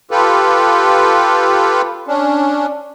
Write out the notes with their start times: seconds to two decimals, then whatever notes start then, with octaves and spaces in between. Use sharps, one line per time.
0.11 F4 G4 A4 B4
2.08 C#4 D4